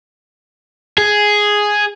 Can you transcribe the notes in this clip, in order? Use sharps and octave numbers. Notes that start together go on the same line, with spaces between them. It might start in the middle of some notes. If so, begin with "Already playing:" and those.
G#4